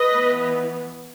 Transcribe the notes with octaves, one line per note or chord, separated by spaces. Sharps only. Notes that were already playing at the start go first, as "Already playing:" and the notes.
Already playing: B4 D#5
E3 B3